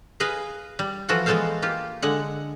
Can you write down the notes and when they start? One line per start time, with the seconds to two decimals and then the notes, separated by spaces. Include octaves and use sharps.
0.20 G#4 B4 D#5 F5
0.79 G3
1.09 E3 F3 F#4 A4 F#5
1.26 E3 G#3 B3 A4 C5 F5
1.62 A#3 F4 G4
2.02 D3 G#3 F#5